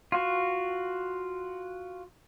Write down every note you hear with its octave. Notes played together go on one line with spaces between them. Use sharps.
F4 F#4